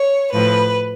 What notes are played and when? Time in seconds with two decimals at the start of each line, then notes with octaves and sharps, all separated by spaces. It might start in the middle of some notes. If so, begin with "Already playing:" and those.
Already playing: C#5
0.32 A2 F3 B4